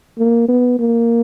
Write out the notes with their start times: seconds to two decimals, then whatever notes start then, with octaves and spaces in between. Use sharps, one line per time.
0.18 A#3
0.49 B3
0.79 A#3